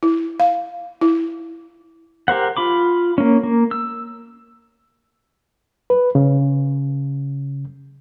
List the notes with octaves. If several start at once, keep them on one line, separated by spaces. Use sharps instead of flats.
E4
F5
E4
G4 A#4 C5 F#5
F4 B5 D6
A#3 C#4
A#3
E6
B4
C#3